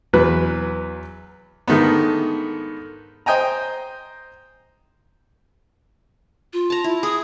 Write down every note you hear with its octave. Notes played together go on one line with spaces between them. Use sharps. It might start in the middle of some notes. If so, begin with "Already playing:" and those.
E2 F#3 B4
G#2 D3 D#3 A3 B3
C5 D#5 G5 G#5 A#5
F4
A5 A#5
E4
G#4 D#6